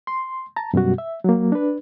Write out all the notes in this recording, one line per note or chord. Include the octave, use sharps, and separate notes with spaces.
C6
A5 A#5
F#2 B2 G3 F#4
E5
F#3 A#3
D4 B4